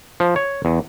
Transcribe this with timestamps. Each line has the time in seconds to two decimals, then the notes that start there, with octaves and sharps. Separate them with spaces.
0.20 F3
0.36 C#5
0.65 E2